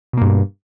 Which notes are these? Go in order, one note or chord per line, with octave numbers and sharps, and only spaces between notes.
G2 B2 A#3